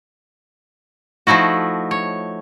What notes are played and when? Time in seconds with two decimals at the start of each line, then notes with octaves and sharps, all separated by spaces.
1.27 F3 A3 D#4 E4 F#4
1.91 C#5